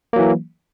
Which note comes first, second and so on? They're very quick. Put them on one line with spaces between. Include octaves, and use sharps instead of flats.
A#3 F#3 E3